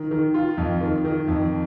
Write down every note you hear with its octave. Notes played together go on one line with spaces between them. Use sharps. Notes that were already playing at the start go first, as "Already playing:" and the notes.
Already playing: D#3
D#3
F4
F2
D#3
D#3
F2